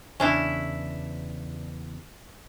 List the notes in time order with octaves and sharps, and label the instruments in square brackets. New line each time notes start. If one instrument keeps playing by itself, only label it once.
[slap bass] E2 C#3 [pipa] C#4 D4 E4